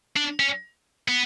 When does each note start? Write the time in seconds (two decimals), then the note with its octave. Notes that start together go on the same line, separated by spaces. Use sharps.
0.17 D4
0.40 C#4
1.08 B3